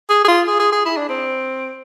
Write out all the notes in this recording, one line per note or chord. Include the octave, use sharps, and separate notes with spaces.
G#4
G#4
F4
G#4
G#4
G#4
E4
D4
C4